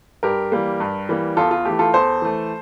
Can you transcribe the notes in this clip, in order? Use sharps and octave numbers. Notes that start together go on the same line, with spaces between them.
G2 G4 A#4
E3 G3 A#3
G2
E3 G3 A#3
E2 F4 A4
F4
E3 A3 G4
F4 A4
E2 A4 C5
E3 A3